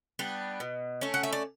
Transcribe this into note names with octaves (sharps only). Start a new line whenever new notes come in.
G3 B3 D4
B2
A3 C#4
F#5
E5
D5